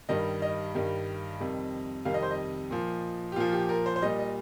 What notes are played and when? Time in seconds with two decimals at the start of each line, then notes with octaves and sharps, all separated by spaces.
0.09 G2 D#3 G3 D#5
0.42 D#5
0.75 G2 D#3 G3
1.40 F2 C3 D#3 G3
2.05 F2 C3 D#3 G3 F5
2.14 D#5
2.22 C5
2.31 D#5
2.71 A#2 F3
3.32 G4
3.36 A#2 F3 F4
3.53 G4
3.69 A#4
3.86 C5
3.96 C5
4.02 A#2 G3 D#5
4.19 D#5